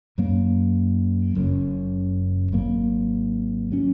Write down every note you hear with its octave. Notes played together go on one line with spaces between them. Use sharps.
F#2 F#3 A#3
F#1 F#2 C#3
G#1 G#2 F#3 A#3
F#3 C#4